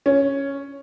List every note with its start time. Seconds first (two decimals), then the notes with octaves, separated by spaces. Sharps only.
0.06 C#4